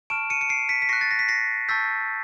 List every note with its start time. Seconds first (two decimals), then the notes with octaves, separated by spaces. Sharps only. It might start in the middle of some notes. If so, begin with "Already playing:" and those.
0.10 A5 C#6 F6 D7 E7
0.30 C#7 D#7
0.41 C#7
0.49 C7 D7
0.69 B6 C#7
0.82 B6
0.89 C#6 F#6 A#6 C7
1.01 A6
1.11 A#6
1.19 B6
1.28 A#6 C7
1.68 A5 C#6 E6 G6 A6 B6